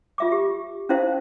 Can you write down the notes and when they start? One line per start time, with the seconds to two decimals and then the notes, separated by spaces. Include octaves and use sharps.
0.18 F4 E5 D6
0.32 G4
0.89 C#4 D#4 E4 C5 F5